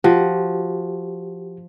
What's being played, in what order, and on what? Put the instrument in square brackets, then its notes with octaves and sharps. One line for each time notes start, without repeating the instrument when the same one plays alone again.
[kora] F3 F#4 [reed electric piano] G4